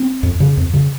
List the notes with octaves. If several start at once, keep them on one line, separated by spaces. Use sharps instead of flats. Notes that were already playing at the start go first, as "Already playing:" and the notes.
Already playing: C4
F2
C#3
F2
C#3